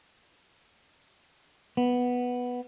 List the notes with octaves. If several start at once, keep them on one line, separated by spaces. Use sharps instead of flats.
B3